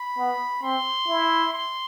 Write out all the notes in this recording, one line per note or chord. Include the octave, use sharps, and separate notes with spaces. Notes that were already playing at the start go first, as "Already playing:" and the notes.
Already playing: B5
B3
C4 C6
E4
C6